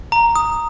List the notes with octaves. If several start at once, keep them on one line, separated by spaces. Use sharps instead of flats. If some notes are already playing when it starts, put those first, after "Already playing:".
A#5
D#6